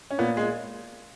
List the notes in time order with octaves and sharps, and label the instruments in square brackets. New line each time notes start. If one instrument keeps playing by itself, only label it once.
[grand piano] C#4
[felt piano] A#2 [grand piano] B3
[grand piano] G#3